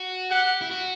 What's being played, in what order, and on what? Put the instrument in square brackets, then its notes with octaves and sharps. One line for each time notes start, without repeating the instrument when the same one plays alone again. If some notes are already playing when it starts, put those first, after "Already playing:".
Already playing: [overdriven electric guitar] F#4
[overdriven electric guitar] G4 [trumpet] F#5
[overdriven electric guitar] E4
F#4